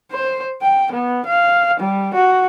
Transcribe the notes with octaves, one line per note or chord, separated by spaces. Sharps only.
C5
G5
B3
F5
G3
F#4